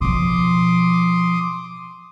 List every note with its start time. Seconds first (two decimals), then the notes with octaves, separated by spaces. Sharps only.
0.01 B2 F3 C6 D6 D#6